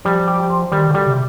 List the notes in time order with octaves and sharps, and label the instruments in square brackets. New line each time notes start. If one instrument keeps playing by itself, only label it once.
[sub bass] F3 [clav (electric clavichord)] G3
[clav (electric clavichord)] G4
C5
[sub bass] D#3 [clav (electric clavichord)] G3
[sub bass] D3
[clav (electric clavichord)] G3
[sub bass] C3